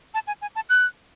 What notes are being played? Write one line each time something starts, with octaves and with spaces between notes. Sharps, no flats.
A5
G#5
G#5
A5
F#6